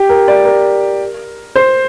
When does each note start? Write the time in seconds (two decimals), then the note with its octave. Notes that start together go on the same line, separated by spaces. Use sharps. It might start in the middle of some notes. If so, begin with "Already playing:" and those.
Already playing: G4
0.09 A#4
0.28 D5
0.45 A#4
1.56 C5